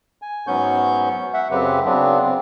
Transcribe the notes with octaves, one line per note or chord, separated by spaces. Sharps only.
G#5
G#2 F#3 B3 C#4 C#6 G6
E5 F#5
F#2 C#3 F#3 C4 G4 B4
C#3 F#3 B3 C4 D4
C4